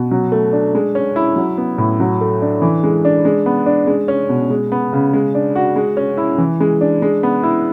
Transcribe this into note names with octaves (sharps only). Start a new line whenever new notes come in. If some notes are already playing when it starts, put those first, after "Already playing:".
Already playing: B2
F#3
A3
D4
G#3
C#4
E4
F#3
B3
A2
F#3
A3
D4
E3
G#3
D4
G#3
B3
D4
G#3
C#4
B2
G#3
B3
C#3
G#3
D4
F#4
G#3
C#4
E4
E3
G#3
D4
G#3
B3
E4